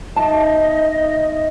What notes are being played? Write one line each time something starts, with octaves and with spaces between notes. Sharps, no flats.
B3 D#4 D#5 E5 A5